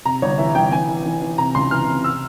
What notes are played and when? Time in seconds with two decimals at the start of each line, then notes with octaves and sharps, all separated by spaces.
0.05 C3 A#5
0.22 G1 C#5
0.38 E3 E5
0.55 G1 G5
0.72 E3 G#5
0.88 E3
1.05 E3
1.21 E3
1.38 C3 A#5
1.55 C#2 C6
1.71 E3 F6
1.88 C3
2.04 E6